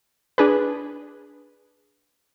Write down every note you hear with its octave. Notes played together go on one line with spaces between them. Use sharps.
D4 G#4 B4